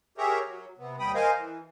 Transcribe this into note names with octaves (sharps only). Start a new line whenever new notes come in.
G4 G#4 A#4 C#5 E5 A#5
F#3
C3 B3
D#2 G3 G5 B5 D#6
A#4 C5 D#5 F5 G#5
E3